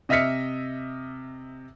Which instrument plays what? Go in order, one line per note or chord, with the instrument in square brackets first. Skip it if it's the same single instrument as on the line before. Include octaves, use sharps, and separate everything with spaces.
[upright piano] C3 D#5 E5 F6 B6 C#7